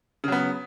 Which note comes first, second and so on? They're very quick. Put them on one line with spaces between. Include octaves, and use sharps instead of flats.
C#3 F#3 B3